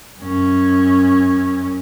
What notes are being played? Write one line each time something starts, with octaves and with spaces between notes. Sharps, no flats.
F#2 C#4